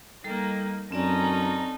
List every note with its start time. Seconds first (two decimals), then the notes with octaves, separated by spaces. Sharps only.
0.24 G3 A#3 D#4 A4
0.92 F#2 C4 C#4 D#4 A4 D5 A#5